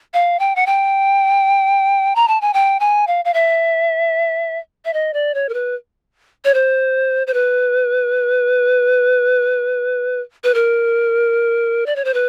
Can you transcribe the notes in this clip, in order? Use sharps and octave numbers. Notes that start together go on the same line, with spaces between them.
F5
G5
F#5
G5
A#5
A5
G#5
G5
G#5
F5
F5
E5
E5
D#5
D5
C#5
A#4
B4
C#5
C5
C5
B4
B4
A#4
D5
C#5
C5
B4